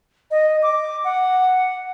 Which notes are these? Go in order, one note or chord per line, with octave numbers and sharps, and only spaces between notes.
D#5
D6
F#5